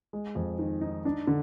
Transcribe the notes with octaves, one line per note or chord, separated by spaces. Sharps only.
G#3
F2
D#3
D#4
D4
D3